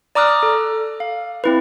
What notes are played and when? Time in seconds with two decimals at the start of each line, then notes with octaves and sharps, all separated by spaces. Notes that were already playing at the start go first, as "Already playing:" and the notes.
0.15 D5 A#5 D6 D#6 F6 F#6
0.43 A4
1.00 F5
1.44 C4 E4 B4